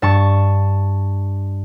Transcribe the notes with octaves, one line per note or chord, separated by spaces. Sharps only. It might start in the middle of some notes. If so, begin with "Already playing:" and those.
G2 A5 C#6